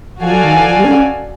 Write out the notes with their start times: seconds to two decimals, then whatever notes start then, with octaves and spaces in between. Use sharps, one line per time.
0.21 F3 F#4 A4 D5 F5 G#5
0.31 F#3
0.43 D#3
0.55 E3
0.66 F3
0.78 G3
0.85 D4
0.89 C#4